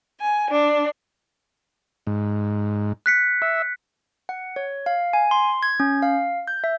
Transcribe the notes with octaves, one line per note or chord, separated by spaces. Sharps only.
G#5
D4
G#2
F#6 B6 C#7
E5
F#5
C#5
F5
G#5
C6
G#6
C#4
F5
G6
E5